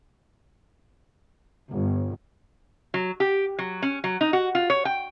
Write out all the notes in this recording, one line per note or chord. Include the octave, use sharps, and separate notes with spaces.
G1
F#3
G4
F#3
C#4
F#3
D#4
F#4
F4
C#5
G5